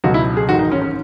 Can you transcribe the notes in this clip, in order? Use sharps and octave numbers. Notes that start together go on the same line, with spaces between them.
C#2 B2 F#3 F#4
E4
G#4
A1 G#2 D#3 F#4
D#4
C#4
C#4